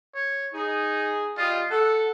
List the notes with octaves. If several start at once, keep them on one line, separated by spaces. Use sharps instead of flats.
C#5
D#4 G#4
G3 F4 D#5
A4 F#5